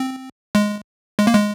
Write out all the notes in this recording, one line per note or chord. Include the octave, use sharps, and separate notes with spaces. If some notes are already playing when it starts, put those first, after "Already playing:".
Already playing: C4
G#3
G#3
A#3
G#3